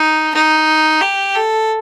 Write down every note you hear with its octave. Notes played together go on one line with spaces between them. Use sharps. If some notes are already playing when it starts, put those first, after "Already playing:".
Already playing: D#4
D#4
G4
A4